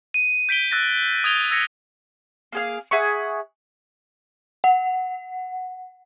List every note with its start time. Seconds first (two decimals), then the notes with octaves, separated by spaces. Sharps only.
0.14 D#7
0.49 G6 B6 D7 G7
0.71 E6 F#6 A6 A#6
1.24 D#6 G#6 F7 G7
1.51 E6 G#6 A#6 C#7
2.53 A#3 G#4 F5
2.91 G#4 E5 F#5 C#6
4.64 F#5